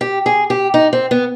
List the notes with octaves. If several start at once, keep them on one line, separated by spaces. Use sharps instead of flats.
G4
G#4
G4
D#4
C4
B3